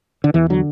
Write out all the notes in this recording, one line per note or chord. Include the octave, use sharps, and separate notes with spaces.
D3
E2 E3
D3 F#3